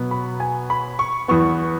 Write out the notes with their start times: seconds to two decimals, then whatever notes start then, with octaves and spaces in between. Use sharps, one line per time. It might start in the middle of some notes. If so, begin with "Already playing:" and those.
Already playing: B2 F#3 B3
0.11 B5
0.40 G#5
0.70 B5
0.99 C#6
1.28 E2 E3 B3 C#6